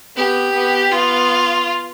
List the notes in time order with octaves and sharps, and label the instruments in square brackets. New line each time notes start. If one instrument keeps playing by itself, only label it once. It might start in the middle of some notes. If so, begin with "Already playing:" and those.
[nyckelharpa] B3 [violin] G4
[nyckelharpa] B3
[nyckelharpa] B3 [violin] F4